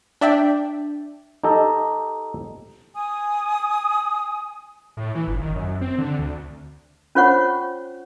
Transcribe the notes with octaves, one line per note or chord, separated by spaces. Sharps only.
D4 D5 E5 G5
D#4 G4 A4 D#5
G#5 D#6
A2
E3
G1
D#3
F#2
C4
D3
D2
C#4 F4 C5 C#5 F#5 C#6